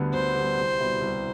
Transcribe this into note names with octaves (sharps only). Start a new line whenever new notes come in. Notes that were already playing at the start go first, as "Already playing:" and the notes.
Already playing: D2 D3 G3 B3
D2 C5
D3 G3 B3
C2
B2 G3 B3 E4
C2